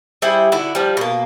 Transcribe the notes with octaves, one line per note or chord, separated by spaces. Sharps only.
G3 E4 G#4 C5
D3 E4 F#4
F3 G3
B2 A#3